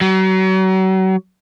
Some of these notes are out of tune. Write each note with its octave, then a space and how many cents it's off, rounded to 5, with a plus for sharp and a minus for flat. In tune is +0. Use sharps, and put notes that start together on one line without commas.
F#3 +35